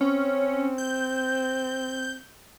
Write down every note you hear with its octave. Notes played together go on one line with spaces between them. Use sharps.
C4 C#4
G6